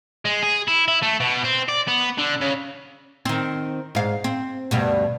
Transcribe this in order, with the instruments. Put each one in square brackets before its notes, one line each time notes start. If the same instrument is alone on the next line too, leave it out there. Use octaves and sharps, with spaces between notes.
[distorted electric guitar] G#3
G#4
E4
E4
A3
B2
C4
D5
B3
D3
C#3
[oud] D#3 C4
G#2 F5
C4
D2 G2 B2